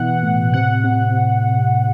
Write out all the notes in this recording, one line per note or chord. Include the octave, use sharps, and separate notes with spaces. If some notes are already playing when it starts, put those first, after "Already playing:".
Already playing: B2 E3 F#5
A2
C3 F#5
C3